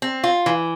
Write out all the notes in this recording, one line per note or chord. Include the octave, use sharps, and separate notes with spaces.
C4
F4
E3